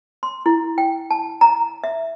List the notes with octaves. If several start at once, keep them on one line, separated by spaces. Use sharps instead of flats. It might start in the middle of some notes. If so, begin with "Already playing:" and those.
C6
E4
G5
A5
A#5
E5